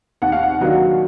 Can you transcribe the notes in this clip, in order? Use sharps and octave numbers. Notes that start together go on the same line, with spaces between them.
D#2 F#5
F5
F#5
D#3 F#3 A#3 D4